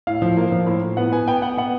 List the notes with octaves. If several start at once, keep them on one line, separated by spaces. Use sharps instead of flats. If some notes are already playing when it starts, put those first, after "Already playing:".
A2 F5
F3
A#3
F3
A2
A2
B3 F#5
B3 G#5
B3 G5
B3 F#5
B3 F#5